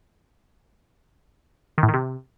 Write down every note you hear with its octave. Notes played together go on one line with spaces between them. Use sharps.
D#3
A2
D#3
C3